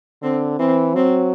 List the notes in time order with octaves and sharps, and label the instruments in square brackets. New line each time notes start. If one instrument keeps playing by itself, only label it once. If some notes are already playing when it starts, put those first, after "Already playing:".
[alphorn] D3 [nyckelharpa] C4
[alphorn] E3 [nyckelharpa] C4
[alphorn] F#3 [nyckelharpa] C4